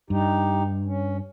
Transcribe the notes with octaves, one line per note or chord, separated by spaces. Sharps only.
G2 D#4 G4
C#4